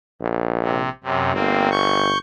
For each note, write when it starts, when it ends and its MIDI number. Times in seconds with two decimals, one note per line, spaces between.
0.21 0.88 34
0.62 0.89 48
1.04 1.32 42
1.04 1.32 48
1.33 2.15 31
1.33 1.69 58
1.33 1.69 60
1.71 2.18 85
1.71 2.18 91